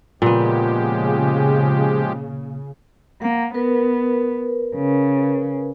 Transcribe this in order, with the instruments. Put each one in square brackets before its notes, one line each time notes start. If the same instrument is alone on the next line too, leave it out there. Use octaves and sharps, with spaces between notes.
[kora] A#2 B3 [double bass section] C#3 [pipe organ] F3 G#3 G4
[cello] A#3 [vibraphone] F#5
[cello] B3 [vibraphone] A#4 B4
[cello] C#3